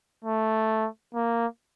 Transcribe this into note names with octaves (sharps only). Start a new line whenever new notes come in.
A3
A#3